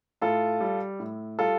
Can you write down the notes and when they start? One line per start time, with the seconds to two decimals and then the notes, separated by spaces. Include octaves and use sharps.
0.21 A2 F4 A4
0.61 G3
1.00 A2
1.39 G3 F4 A4